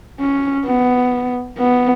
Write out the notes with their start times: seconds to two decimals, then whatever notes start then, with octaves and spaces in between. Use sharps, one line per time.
0.20 C#4
0.65 B3
1.58 B3